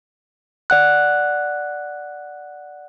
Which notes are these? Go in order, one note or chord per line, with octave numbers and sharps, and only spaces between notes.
D5 F#5 F#6